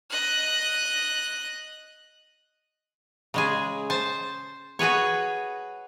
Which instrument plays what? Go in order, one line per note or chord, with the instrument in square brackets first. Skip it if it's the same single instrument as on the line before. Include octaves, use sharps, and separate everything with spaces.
[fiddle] D#5 F#6
[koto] C#3 G#3 G#4
C5 A5
F#4 G#4 B4 C#5